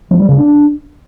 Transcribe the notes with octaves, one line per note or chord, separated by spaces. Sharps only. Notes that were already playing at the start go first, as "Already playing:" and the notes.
F3
G3
C#3
D4